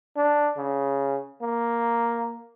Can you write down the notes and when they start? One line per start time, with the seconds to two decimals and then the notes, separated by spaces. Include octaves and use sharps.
0.16 D4
0.57 C#3
1.41 A#3